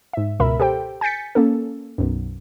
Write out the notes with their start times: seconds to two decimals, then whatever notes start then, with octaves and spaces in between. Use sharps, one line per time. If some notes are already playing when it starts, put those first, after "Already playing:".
0.13 G#2 E5
0.40 C#2 B2 A#4 E5 B5
0.60 G4 A4 C5 G5
1.01 G#5 G6 A6 B6 C#7
1.35 A#3 C#4 A4
1.98 B1 F#2